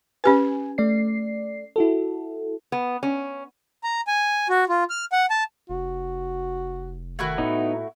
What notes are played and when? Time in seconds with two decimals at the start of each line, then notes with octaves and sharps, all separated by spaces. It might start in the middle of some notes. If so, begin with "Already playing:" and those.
0.24 C#4 G4 B4 G#5
0.78 A3 D5 C7
1.76 E4 F#4 A4
2.72 B3
3.03 C#4
3.83 A#5
4.07 G#5
4.49 F#4
4.69 F4
4.90 F6
5.12 F#5
5.30 A5
5.70 F1 F#4
7.19 D#3 A3 E4 F#4
7.38 A2 B3 D#4